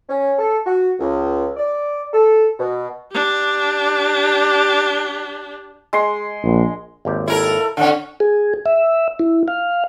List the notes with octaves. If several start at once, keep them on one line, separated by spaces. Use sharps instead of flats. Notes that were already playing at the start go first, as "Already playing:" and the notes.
C#4
A4
F#4
C#2
D5
A4
B2
D4 G4
G#3 C6
A#1
G#1 D#2 G4
E4 A4 A#4
A2 D3 C#4 F#5
G#4
E5
E4
F5